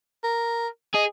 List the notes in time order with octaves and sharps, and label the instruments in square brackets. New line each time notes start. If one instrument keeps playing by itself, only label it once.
[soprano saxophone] A#4
[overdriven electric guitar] G#4 [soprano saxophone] D#5